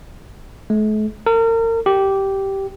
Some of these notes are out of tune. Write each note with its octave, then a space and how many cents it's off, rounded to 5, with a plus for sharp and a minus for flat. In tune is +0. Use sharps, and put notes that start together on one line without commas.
A3 -45
A#4 -35
G4 -10